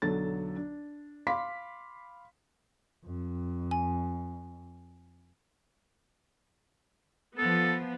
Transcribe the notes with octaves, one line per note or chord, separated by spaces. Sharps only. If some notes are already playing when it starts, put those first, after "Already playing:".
B1 D3 F#3 A4 A6
D4
F5 B5 C6 D6 B6
F2
G#5
F3 B3 A4